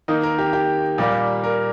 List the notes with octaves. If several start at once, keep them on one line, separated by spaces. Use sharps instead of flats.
D#3 A#3 D#4
A#4
G4
G4
A#2 G3 A#3
A#4